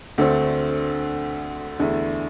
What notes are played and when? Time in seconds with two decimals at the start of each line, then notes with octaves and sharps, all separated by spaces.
0.18 D2 D3 A3 C4
1.79 E2 D3 A3 E4